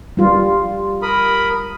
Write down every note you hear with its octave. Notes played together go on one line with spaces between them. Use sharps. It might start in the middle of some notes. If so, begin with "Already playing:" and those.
G3 F4
A#4 B5 D#6